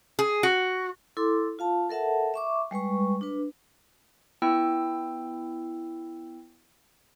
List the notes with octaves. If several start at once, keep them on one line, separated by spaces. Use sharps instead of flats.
G#4
F#4
E4 A4 C6 D6
F4 F5 A5
A4 A#4 E5 F#5 A5
E5 C#6 D6
G3 G#3 B4 C#6
D4 B4
B3 E4 G5 E6